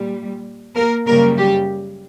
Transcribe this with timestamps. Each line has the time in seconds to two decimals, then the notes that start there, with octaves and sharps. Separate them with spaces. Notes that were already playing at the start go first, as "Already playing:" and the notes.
Already playing: A#2 G3
0.75 A#3 A#4
1.06 F#2 C#3 G3 A#3 A#4
1.38 G3 G4